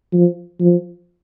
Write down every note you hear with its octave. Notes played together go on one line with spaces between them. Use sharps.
F3
F3